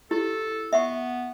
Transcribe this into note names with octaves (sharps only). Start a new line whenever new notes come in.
E4 G4 A4
B3 E5 F#5 C#6